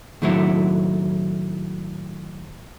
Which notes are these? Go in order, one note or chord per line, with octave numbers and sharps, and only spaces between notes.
A2 D#3 F#3 A3 E4